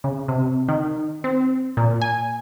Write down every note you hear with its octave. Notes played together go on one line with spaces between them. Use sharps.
C#3
C3
D#3
C4
A#2
G#5